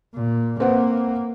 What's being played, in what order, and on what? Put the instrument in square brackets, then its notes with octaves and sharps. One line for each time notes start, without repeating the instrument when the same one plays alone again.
[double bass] A#2
[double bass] A#3 [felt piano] C4 B4 F#5